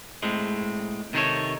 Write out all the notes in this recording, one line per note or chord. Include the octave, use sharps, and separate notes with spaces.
A2 G#3 C4
C3 D#3 D#4 G#4 A4 C#5